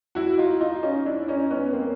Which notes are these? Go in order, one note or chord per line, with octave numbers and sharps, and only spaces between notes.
E4 F#4
D#4 F4
D#4 F4
C#4 D#4
D4 E4
C#4 D#4
B3 C#4
A#3 C4